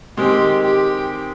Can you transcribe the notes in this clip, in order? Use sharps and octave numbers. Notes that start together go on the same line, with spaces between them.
D#3 G#3 C4 G4
G4